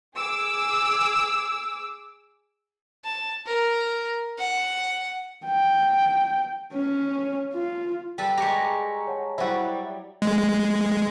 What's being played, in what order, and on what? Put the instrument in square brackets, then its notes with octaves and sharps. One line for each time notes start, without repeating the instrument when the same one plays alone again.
[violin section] G#4 D6 E6
[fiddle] A5
A#4
F#5
[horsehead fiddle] G5
C#4
F4
[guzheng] G3 A4 B4 [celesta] G5 A5
[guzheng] G#3 G4 [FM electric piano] A#5 C#6
[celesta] C#5 F#5 A5
[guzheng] F#3 G3 [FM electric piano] E4 F#4 [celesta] C5
[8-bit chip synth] G#3